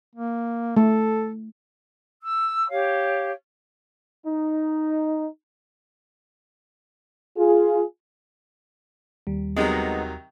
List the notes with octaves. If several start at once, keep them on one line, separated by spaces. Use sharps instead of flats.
A#3
A3 A4
E6
G4 C#5 F5
D#4
F4 G#4
D#2 G3
C3 D#3 F#3 G#3 B3 D#4